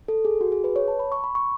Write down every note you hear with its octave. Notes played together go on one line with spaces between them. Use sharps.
A4
G#4
F#4
G#4
B4
C#5
A5
B5
C#6
B5
C#6